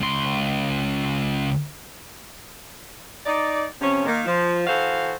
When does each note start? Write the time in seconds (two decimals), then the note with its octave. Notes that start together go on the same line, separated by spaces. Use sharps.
0.01 C#2 C6
3.26 D#4 D5
3.82 C3 F3 C#4
4.06 D#3 A#3
4.26 F3
4.67 E3 F#4 A4 C5 F5